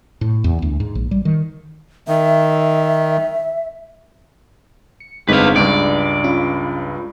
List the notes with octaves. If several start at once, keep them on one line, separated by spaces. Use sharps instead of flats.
A2
E2
D2
G#2
A#1
G3
D#3
D#3 E5
C#7
G1 G#3 C4 D#4 B4 F5
C#2 G2 D5
C#4 F4 B5